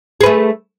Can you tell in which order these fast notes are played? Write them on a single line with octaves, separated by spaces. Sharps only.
G#4 B4 A3